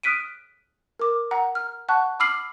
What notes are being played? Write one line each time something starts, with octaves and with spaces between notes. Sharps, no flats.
D#6 F6 F#6 B6 D7 D#7
A#4 D6
F#5 A#5
F6
F#5 A5 C#6 F#6
B5 D6 E6 F6 C7 F#7